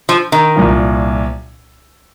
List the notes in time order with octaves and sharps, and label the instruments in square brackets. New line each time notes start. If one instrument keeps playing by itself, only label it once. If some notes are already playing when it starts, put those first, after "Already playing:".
[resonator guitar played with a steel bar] F3
D#3
[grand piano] C2 A#2 F3